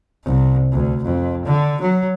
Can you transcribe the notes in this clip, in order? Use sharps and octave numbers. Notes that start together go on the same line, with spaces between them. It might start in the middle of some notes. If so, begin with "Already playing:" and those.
C2
D2
F2
D3
F#3